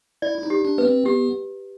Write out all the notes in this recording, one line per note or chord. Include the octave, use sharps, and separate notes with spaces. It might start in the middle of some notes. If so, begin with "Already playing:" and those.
E4 D5
E4
D#4
G4
D4
B3 B4
C4
B3 G4